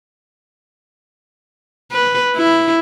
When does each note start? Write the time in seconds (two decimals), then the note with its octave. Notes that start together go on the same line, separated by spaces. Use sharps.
1.92 B4
2.36 E4